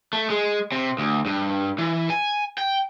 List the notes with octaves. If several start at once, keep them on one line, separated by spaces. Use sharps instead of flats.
A3
G#3
C3
D2
G2
E3
G#5
G5